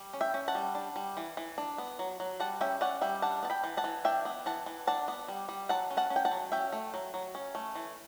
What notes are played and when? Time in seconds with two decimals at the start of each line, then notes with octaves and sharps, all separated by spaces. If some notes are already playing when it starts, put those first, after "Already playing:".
Already playing: G3
0.13 C#4
0.21 E5 G5
0.34 C#4
0.48 F#5 A5
0.55 G3
0.75 D4
0.96 G3
1.17 E3
1.37 E3
1.58 D4
1.78 B3
1.99 F#3
2.20 F#3
2.40 G3 F#5 A5
2.61 C#4 E5 G5
2.81 C#4 D5 F#5
3.01 G3 E5 G5
3.22 D4 F#5 A5
3.43 B3 A5
3.50 G5 B5
3.64 E3
3.77 F#5 A5
3.84 E3
4.05 D4 E5 G5
4.25 B3
4.46 E3 F#5 A5
4.66 E3
4.87 D4 F#5 A5
5.08 B3
5.28 G3
5.49 G3
5.69 F#3 F#5 A5
5.91 C#4
5.97 F#5 A5
6.10 C#4
6.16 G5
6.25 F#5 A5
6.31 F#3
6.52 C#4 E5 G5
6.72 A3
6.94 F#3
7.14 F#3
7.35 C#4
7.55 A3
7.75 E3